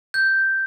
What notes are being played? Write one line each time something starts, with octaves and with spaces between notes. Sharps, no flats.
G6